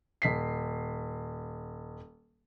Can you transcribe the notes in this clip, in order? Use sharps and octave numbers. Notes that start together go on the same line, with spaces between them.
D#1 B6 C7